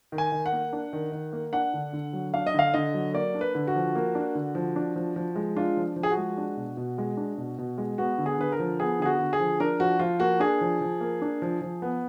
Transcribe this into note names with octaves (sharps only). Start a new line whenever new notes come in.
D#3
G#5
D#3
F#5
A#3
D4
D#3
D#3
A#3
D4 F#5
D3
D3
F#3
D4 F5
D#5
D3 F5
D3 D#5
F#3
A#3 D5
D4
B4
D3
F#4
F3
A#3
D4
D3
F3
D4
F3
F3
G#3
D4 F4
F3
F3
G#4
F#4
G#3
D4
B2
B2
G#3
D4
B2
B2
G#3
B3 F#4
D3
G#4
D3 B4
A#4
F3
B3 G#4
D3 G#4
F#4
D3
G#4
F3
D4 A#4
F3 F#4
F3 F4
A#3 F#4
D4 G#4
F3
F3
A#3
D4
F3
F3
B3